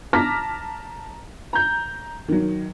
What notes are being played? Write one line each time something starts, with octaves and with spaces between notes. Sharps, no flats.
A5 A#5 D6 F6 A#6 B6
A#5 G6
D#3 F#3